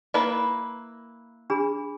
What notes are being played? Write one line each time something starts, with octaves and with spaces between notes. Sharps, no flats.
A#3 E4 B4
D4 G#4 B5